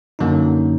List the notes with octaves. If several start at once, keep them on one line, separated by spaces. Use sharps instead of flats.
F#2 D3 F#3 A#3 D#4